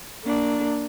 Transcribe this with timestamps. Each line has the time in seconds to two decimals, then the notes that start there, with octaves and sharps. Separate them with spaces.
0.25 A#3 D4